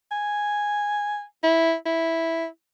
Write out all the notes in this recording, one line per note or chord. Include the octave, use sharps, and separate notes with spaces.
G#5
E4
E4